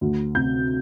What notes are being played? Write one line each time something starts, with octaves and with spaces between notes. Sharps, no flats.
D2
C3 G6